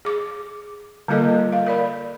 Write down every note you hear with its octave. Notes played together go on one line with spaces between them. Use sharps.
G#4 D6
D3 G3 A#3 F4 A4 D#5
F5
A#4 D5 B5